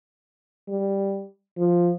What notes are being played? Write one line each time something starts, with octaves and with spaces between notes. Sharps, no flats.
G3
F3